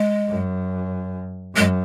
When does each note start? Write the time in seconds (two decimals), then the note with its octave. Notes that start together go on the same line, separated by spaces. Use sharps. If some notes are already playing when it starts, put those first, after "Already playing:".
Already playing: G#3
0.29 F#2
1.55 F#2 G#3